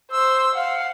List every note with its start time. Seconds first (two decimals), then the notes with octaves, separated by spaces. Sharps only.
0.11 C5 E6
0.55 F5 F#5